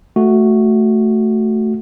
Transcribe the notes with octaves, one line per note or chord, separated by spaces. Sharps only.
A3 F#4